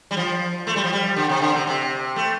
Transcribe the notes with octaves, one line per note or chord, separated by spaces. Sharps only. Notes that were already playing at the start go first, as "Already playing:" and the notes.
G3
F3
A3
G3
F3
G3
D3
C3
D3
C3
C3
A3